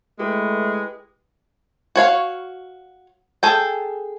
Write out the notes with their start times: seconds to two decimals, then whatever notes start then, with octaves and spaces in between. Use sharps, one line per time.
0.19 G#3 A3 E4 G4 B4
1.96 F#4 C#5 F5
3.43 G#4 A4 G5